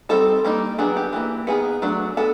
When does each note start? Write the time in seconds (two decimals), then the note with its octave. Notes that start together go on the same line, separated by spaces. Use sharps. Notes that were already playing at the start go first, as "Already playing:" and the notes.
0.09 G3 C4 D#4 A4
0.44 G3 A#3 D#4
0.78 D#3 F#3 B3 D4 G#4
0.97 G4
1.13 E3 G3 A#3
1.47 D#3 F#3 B3 G#4
1.82 F#3 A3 D4
2.17 G#3 B3 A4